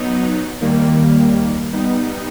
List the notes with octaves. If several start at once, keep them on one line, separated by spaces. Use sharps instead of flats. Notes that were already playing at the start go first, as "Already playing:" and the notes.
Already playing: F#3 B3 D#4
D#2 D#3 G3 A#3
G3 B3 D#4